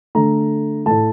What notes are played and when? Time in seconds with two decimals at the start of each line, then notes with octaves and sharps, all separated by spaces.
0.15 D3 A3 A#5
0.86 A2 A3 A5